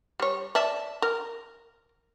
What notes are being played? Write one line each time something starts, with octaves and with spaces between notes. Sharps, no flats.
G3 C#5
D5 E5 A5
A#4